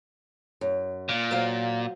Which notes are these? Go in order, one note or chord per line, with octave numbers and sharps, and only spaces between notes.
F#2
A#2
F#3 C5 F5